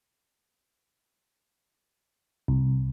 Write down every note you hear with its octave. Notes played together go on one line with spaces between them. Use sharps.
C2